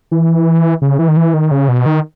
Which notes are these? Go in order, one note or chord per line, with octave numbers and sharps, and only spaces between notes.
E3
C#3
E3
D#3
E3
D#3
C#3
B2
D#3